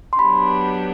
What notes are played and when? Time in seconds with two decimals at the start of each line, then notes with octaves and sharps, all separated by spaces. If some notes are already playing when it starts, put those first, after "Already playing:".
0.13 C6
0.18 F#3 B3 D4 G4 B5